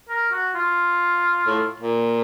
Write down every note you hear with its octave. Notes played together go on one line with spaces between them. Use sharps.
A#4
F#4
F4
A2
A#2